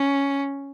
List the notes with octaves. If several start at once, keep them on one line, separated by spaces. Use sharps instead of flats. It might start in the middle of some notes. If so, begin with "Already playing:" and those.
Already playing: C#4